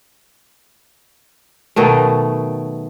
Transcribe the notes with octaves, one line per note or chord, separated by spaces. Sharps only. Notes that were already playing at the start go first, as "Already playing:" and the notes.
B2 D#3 F#3 A3